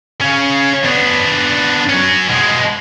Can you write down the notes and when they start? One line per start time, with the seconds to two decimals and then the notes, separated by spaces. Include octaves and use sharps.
0.21 C#3 C#4
0.84 B3 D4
1.89 F#3 C#4
2.29 B2 G#3